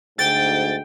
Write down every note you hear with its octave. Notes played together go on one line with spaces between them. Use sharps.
D2 G#2 G5 A6